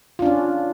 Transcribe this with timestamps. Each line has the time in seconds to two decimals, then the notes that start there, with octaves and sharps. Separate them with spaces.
0.19 F4
0.22 D4
0.26 C#4